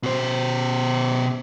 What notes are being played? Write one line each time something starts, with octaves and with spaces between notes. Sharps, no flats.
B2 C5